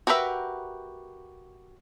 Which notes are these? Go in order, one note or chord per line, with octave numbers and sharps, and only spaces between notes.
F#4 G4 A#4 B4 E5